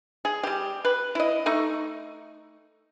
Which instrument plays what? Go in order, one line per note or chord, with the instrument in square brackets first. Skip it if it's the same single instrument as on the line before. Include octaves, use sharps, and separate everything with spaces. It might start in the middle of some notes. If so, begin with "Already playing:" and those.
[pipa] G#4
G3 G4
B4
E4 D#5
A3 D#4 C#6